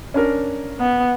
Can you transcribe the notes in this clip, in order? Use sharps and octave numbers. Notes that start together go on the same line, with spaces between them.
C#4 D4 A#4
B3